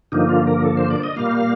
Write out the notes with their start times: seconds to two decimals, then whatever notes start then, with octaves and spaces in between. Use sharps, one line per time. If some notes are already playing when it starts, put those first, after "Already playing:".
0.12 G2 D3 F3 A#3 D#4
0.29 F4
0.47 A#4
0.64 A4
0.77 C5
0.90 D5
1.03 D#5
1.16 A#2 G3 A#3 F5